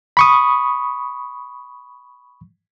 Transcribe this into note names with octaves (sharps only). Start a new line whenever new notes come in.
B5 C#6 D#6